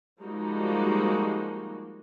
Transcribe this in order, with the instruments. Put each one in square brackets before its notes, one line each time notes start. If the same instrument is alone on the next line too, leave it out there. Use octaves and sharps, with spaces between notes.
[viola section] F3 G3 G#3 A#3 D#4 F#4